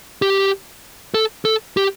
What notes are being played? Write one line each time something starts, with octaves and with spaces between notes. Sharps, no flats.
G4
A4
A4
G4